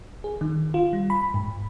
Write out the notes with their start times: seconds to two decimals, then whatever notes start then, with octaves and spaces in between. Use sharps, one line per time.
0.24 G#4
0.41 D#3
0.74 F4
0.93 G3
1.10 B5
1.34 G#2